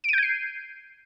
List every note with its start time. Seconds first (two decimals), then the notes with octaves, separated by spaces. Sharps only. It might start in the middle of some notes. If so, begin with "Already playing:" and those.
0.04 D7
0.09 D#7
0.13 G6
0.18 G#6
0.23 C7